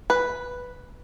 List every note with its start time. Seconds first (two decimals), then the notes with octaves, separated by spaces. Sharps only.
0.10 B4